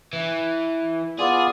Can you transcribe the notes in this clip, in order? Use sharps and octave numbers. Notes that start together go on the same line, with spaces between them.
E3
B3 F4 G#4 D5